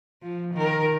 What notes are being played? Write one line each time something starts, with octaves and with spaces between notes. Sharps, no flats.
F3
D#3 A#4